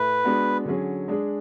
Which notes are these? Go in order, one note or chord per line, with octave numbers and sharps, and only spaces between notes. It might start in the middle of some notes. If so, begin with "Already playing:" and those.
Already playing: A2 B4
G#3 B3 D4 F#4
D3 F#3 C#4 G#4
G#3 D4 G#4